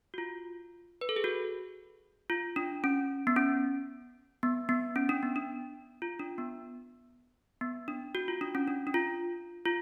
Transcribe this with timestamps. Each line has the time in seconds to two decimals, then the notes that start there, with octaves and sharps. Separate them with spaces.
0.14 F#4
0.18 F4
1.01 B4
1.09 A4
1.16 G#4
1.24 F#4
2.30 F4
2.56 D4
2.84 C#4
3.27 B3
3.36 C#4
4.43 B3
4.69 B3
4.96 C#4
5.09 D4
5.23 B3
5.36 D4
6.02 F4
6.19 D4
6.38 B3
7.61 B3
7.88 D4
8.15 F#4
8.28 F4
8.41 D4
8.55 C#4
8.68 D4
8.87 D4
8.94 F4
9.65 F4